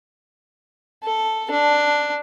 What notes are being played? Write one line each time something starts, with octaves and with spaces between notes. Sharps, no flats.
A4
D4